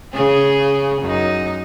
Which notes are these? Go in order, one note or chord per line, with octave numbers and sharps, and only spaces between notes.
C#3 G#4
F#2 D#4